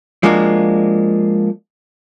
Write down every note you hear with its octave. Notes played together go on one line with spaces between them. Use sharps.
F3 G#3 A#3 D4 F#4